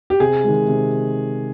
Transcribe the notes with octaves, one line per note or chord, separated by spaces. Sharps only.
G4
C3 G#4
D#3 G#3
C3